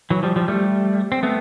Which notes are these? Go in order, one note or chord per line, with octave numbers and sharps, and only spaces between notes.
E3 F#3
F3 G3
F3 G3
G3 A3
C4
A3 B3